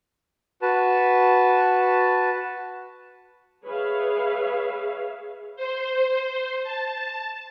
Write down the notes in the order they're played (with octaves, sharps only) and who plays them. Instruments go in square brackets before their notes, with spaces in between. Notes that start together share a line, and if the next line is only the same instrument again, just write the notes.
[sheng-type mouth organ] F#4 B4 A5
[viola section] G#4 B4 C#5 E5 F5
[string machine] C5
A5